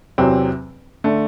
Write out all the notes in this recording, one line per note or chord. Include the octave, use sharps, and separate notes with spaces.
E2 C3 F#3 C4
D3 A3